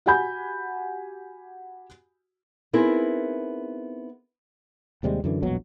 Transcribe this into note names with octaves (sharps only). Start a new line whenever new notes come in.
F#4 G4 F#5 G#5 B5 G6
B3 C4 D#4 E4 G#4 A#4
D#2 C3 G3 G#3
F#2 D3 E3
E1 A#1 B2 F#3